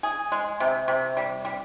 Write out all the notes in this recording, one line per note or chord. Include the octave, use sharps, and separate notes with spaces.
G#4
G#3
C3
C3
G3
G3